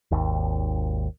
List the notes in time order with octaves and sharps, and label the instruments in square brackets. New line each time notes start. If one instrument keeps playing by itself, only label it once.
[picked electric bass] G#1 D#2